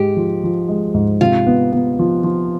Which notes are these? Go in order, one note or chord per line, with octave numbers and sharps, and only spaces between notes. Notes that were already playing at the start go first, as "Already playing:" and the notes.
Already playing: G#2 G#3 G4
F3
F3
G#3
G#2
C3 F4
B3
B3
F3
F3